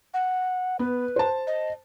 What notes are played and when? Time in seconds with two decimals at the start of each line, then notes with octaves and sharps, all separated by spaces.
0.14 F#5
0.79 B3 B4
1.16 C5 A5
1.47 D#5